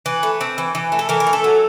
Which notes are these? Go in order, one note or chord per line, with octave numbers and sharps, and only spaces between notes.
E3 B4
A3
C4
E3
E3
A3
A4
E3 A#4
A#4
A3
A4
F#3